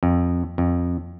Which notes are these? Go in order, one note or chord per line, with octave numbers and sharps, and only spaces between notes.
F2
F2